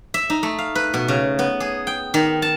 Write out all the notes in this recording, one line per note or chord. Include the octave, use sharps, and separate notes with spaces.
E5
D#4
A3
F5
B4
B2
C#3
B3
G#4
G5
D#3
A5